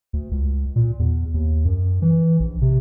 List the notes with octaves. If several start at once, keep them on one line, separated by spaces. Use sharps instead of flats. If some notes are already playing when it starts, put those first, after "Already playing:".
D2
C#2
A#2
E2
D#2
F#2
E3
A#1
C3